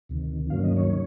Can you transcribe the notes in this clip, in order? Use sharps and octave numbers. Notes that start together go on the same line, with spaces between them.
D2 C3 D#3
G2 D#3 F#3 A#3 C#4 F5
D#5
C#5
C3